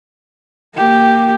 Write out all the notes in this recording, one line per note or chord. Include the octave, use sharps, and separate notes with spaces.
A#3 G4